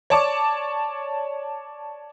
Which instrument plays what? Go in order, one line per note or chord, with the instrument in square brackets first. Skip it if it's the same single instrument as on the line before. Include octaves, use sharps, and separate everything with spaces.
[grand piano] C#5 D5 A5 C#6 D6